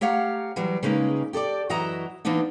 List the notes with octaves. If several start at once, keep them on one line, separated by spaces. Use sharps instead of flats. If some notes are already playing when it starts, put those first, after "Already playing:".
A3 G4 C#5 F5 F#5 A#5
E3 F#3 G3
C#3 G#3 A#3 C#4 D#4 B4
G4 A4 C5 D5
F#2 E3 F#4 D#5 E5 A#5
E3 A#3 B3 D4 D#4